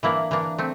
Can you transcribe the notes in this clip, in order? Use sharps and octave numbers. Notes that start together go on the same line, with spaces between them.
E3 A#3 D4 E4
E3 A#3 D4
A3 C4